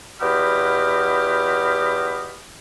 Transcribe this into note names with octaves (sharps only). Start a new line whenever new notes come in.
E2 F#4 G4 D#5 B5 F6